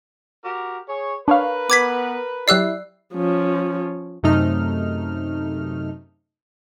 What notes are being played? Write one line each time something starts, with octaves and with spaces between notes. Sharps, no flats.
F#4 G4 A#4
G#4 C#5
D4 A#4 B4 C#5 F5
B3 D6 G#6 B6
F#3 E4 G4 D5 E6 F#6 C7
F3 C#4
F#2 C3 A3 D#4 F6